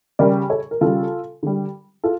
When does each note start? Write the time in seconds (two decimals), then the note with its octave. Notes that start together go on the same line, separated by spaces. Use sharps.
0.19 C#3 G3 A#4 D5
0.50 A4 C#5
0.71 A#4
0.81 C#3 G3 F4 A4
1.43 D3 G3
2.04 F4 A4